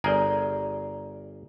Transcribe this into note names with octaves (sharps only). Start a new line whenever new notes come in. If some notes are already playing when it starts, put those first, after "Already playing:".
G1 G#4 A#4 D5 A#5